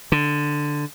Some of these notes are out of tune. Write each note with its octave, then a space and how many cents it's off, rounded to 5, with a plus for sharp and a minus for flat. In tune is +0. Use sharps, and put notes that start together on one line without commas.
D3 +5